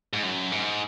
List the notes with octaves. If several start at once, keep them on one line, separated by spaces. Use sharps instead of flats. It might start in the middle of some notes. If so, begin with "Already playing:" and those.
G#2
F#2
G#2